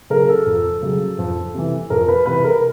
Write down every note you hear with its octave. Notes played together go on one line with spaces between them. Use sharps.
C#3 F#3 A#4
A4
F2
C#3 F#3
F2
C3 E3
F2 A#4
B4
C3 E3 B4
A#4